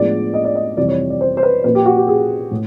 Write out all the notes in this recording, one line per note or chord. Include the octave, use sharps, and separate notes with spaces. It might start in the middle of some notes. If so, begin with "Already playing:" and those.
Already playing: A2 F3 G#3 B3 D4 D5
D#5
D5
D#5
F2 C3 E3 G3 D5
C#5
D5
C5
C5
B4
A#2 F3 A#3 B4
G4
F#4
G4
G#4
A2